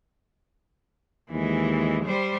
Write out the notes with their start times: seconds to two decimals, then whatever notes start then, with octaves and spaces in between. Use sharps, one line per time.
1.30 D#2 E3 G#3
2.05 G3 C5